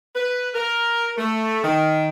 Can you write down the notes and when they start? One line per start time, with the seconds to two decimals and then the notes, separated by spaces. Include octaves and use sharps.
0.16 B4
0.54 A#4
1.18 A3
1.63 D#3